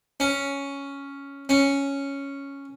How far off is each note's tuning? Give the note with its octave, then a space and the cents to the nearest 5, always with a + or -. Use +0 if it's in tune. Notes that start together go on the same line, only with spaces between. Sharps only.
C#4 +5
C#4 +0